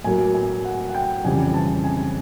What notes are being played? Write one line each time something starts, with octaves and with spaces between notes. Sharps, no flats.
A2 F#3 A#3 G#5
G#5
F#5
F#5
G5
F2 C#3 E3 G3 G#5
A5
G#5